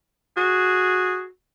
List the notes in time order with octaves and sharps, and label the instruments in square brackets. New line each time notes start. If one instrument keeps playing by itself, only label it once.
[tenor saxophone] F#4 [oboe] G#4